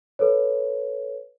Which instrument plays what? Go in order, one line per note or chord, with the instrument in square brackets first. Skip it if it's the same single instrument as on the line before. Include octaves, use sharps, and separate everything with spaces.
[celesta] A4 B4 C#5